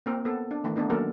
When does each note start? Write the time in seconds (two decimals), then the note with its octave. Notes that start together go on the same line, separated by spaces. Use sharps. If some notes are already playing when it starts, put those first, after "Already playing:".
0.06 A#3 C4 A#4
0.25 B3 A4
0.51 D4
0.64 D#3 E3 A3
0.76 A3 B3 D4 D#4
0.90 D#3 F#3 A#3 C#4 A4 A#4